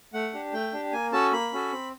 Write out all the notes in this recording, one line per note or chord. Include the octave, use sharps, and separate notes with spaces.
A3 F#5
D4 G4
A3 G5
D4 G4
A#3 G#5
C#4 F#4 A4 A5
A#3 B5
C#4 F#4 A4
C4